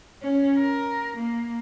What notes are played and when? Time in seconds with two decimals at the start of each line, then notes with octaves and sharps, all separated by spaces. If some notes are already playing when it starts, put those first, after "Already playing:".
0.21 C#4
0.59 A#4
1.17 A#3